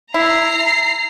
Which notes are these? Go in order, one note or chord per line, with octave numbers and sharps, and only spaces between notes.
E4 A#5 C7